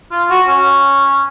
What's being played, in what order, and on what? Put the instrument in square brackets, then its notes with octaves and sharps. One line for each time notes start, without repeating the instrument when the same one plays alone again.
[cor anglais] F4
F#4
C#4